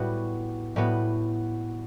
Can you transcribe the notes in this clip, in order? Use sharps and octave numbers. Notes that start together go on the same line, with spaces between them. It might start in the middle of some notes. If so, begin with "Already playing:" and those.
Already playing: A2 G3 B3 F#4 B4
A2 G3 B3 F#4 B4